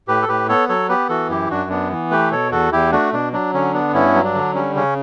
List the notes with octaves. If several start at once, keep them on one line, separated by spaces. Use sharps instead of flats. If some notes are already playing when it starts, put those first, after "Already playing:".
A2 G4 B4
A4
A2 G4 B4
B3 A4 C#5
F#3 A4 C#5
B3 G4 B4
E3 F#4 A4
F#2 E4 G4
F#2 D4 F#4
B3 D4
E3
A3 G4 B4
B2 A4 C#5
E2 F#4 A4
E2 E4 G4
A3 D4 F#4
B2 D4
F#3 D4
D3 C#4
B3 D4
G2 C#4 E4
F#3
D4
D3
G3 C#4
C#3 C#4